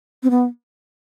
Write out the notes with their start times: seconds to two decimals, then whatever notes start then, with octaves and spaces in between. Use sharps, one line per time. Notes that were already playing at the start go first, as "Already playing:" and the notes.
0.23 C4
0.30 B3